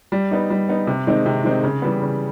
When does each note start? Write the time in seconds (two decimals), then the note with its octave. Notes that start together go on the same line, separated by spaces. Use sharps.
0.12 G3
0.31 B3 D#4
0.50 G3
0.69 B3 D#4
0.87 C3
1.07 D#3 G#3 C4 D#4
1.26 C3
1.44 D#3 G#3 C4 D#4
1.63 C#3
1.82 E3 G3 B3
2.02 C#3